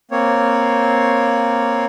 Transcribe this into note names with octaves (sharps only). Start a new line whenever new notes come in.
A#3 C4 C#5